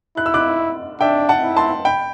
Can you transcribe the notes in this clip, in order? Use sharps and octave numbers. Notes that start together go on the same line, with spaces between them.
E4 F#6
E6
D6 F#6
D4 E5 G5
F#5 A5
E4
A5 C6
G5 B5